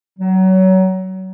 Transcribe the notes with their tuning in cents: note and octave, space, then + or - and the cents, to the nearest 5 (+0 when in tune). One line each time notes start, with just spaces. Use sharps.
F#3 +25